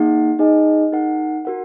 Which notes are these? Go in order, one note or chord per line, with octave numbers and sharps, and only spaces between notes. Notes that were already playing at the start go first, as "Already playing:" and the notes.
Already playing: A#3 D#4 G#4 F#5
D#4 G#4 D#5 G#5
D#4 A#4 F#5
F#4 A#4 F#5